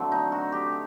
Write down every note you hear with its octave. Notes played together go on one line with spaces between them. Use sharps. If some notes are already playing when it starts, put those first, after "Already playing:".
Already playing: D3 F#3 A3 C4
D#4
F#4
G4